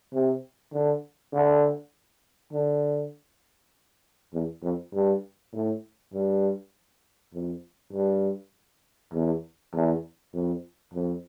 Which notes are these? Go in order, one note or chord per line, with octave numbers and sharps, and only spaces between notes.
C3
D3
D3
D3
E2
F2
G2
A2
G2
F2
G2
E2
E2
F2
F2